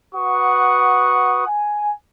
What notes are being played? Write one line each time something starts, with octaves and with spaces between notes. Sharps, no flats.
F#4 B4 F#5 C#6 D#6
G#5